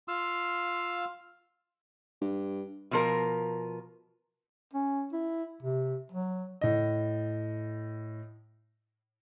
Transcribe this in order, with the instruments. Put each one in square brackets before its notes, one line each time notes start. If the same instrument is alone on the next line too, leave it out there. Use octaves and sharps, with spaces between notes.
[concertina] F4 F5 E6
[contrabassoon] G2
[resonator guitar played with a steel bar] B2 F3 A#4
[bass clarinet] C#4
E4
C3
F#3
[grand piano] A2 D#5